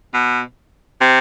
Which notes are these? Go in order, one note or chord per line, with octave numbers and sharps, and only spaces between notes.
B2
C3